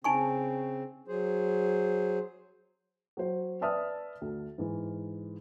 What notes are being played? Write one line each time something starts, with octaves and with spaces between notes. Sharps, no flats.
C#3 C4 D#4 G#5 C#6
F#3 G#4 C5
F#3 C5
B4 D5 E5 A5 D#6 F6
D2
G#2 E3